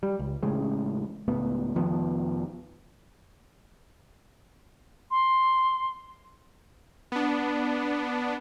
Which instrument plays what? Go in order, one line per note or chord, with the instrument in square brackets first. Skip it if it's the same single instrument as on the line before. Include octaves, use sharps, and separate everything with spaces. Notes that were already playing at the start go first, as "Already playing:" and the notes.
[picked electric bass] G3
C#2
A1 C#3 G#3
C#2 A2 B3
F1 D#3 F3 B3
[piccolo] C6
[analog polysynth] B3 D4